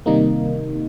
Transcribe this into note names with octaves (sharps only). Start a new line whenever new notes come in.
C3 D#3 G3 A#3 D#4